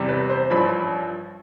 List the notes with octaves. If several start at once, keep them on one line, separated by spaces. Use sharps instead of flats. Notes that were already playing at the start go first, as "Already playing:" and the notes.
Already playing: E2 C3 G3
B4
C5
A1 G2 F3 B5